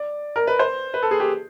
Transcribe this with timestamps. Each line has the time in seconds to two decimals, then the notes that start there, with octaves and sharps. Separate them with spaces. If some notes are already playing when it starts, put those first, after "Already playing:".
Already playing: D5
0.36 A#4
0.47 B4
0.59 C5
0.94 B4
1.02 A4
1.11 G#4
1.20 G4